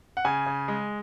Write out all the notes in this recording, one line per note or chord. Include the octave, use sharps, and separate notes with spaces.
F#5
C#3 G#5
C#3
G#3